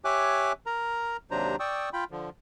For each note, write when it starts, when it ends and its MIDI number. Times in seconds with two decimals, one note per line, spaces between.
0.05 0.52 67
0.05 0.52 73
0.05 0.52 76
0.05 0.52 80
0.05 0.52 86
0.05 0.52 90
0.66 1.17 70
0.66 1.17 82
1.31 1.56 39
1.31 1.56 48
1.31 1.56 54
1.31 1.56 62
1.31 1.56 72
1.31 1.56 82
1.60 1.89 74
1.60 1.89 79
1.60 1.89 85
1.60 1.89 87
1.60 1.89 88
1.93 2.04 65
1.93 2.04 79
1.93 2.04 83
2.11 2.30 50
2.11 2.30 53